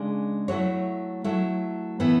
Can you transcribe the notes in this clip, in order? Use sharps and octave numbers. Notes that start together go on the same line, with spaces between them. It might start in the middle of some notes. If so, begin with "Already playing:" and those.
Already playing: C#3 G#3 D4 D5
F#3 A3 E4 C#5
F#3 A3 E4
A2 E3 B3 E4